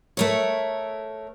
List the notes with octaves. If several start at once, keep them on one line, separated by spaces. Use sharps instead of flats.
A3 A#4 C#5